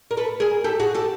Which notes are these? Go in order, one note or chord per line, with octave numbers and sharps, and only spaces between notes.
A#4
A4 B4
G#4 A#4
G4 A4
F#4 G#4
G4 A4